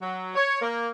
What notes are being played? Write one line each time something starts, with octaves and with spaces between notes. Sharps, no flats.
F#3
C#5
A#3